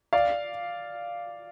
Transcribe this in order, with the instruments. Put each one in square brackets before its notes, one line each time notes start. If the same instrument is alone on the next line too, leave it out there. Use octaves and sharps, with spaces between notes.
[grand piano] D5 F5